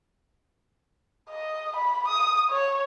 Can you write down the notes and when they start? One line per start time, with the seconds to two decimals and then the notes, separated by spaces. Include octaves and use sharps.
1.30 D#5
1.76 B5
2.07 D#6
2.50 C#5